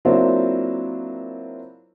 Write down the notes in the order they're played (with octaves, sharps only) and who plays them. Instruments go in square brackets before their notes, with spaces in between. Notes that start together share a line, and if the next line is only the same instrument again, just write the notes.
[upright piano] F#3 A#3 C4 D4 E4 F4